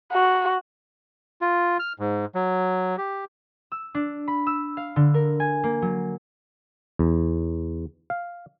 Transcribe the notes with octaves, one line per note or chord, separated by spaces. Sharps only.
F#4
F4
F6
G#2
F#3
G4
E6
D4
B5
E6
F5
D3
A#4
G#5
A#3
F#3
E2
F5